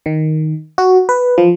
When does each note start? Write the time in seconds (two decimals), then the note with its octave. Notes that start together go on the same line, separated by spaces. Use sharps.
0.06 D#3
0.78 F#4
1.09 B4
1.38 F3